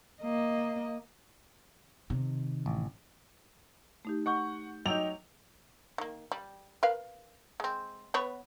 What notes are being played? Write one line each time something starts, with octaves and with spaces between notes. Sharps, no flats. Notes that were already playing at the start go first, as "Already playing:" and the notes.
A#3 D#5
C3 D#3
A1
A3 D#4 G4
F#5 C#6 G6
F#3 D#4 G5 D6 E6 G6 F7
D#3 A#3
G3
A#4 B4 F5
G#3 C4
B3 B4 C#5